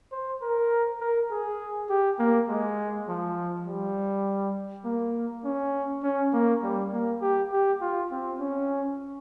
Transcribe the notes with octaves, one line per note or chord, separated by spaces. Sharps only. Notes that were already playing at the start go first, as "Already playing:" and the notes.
C5
A#4
A#4
G#4
G4
A#3
G#3
F3
G3
A#3
C#4
C#4
A#3
G3
A#3
G4
G4
F4
C4
C#4